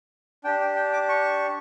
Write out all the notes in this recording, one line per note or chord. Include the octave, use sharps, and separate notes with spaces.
D4 G4 G5
G5
G5
D6
C#6